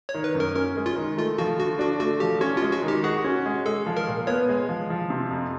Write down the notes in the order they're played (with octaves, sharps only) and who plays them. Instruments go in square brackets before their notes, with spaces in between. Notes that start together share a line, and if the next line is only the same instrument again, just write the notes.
[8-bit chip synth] C#5
[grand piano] D#3
[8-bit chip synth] B4
[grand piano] F#2
[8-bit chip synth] A#4
[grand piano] C#4 [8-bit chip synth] A#4
[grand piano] G#3
[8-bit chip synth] F4
[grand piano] D#3
[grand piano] A3 [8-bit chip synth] F4
[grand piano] F3 [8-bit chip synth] F#4
[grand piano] D3 [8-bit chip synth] F#4
[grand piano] D4 [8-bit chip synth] F#4
[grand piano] A3 [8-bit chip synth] F#4
[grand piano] F3 [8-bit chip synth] G4
[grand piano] C#4 [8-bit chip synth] F#4
[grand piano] G#3 [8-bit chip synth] F4
[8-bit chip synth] F#4
[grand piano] D#3
[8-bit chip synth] G4
[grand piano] F#4 [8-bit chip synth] G#4
[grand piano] C#4
G#3
[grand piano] G#3 [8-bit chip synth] A4
[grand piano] F3
[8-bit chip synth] A#4
[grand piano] A#2
[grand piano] B3 [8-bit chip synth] C#5
[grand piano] G#3
F3
F3
C3
F2